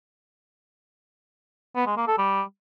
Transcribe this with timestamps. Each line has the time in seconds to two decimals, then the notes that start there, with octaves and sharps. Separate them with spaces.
1.76 B3
1.86 G#3
1.97 A#3
2.08 A4
2.18 G3